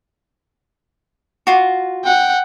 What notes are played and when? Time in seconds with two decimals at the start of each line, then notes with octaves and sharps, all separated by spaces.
1.47 F4 F#4
2.04 F#5 G5